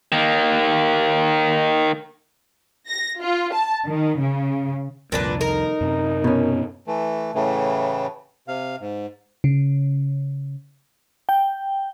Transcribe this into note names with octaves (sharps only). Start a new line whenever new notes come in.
D#3 A#3
A#6
F4
A5
D#3
C#3
C2 F2 A#2 D4 B4
D#4 A#4
F#2 C3 C4
B2 C#4
E3 A3
A2 C#3 E3 A3
C3 F5
G#2
C#3
G5